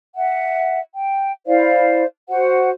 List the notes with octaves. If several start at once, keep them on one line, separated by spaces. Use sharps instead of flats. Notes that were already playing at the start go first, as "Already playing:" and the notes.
E5 F#5
G5
E4 C5 D5 F5
F#4 C5 F#5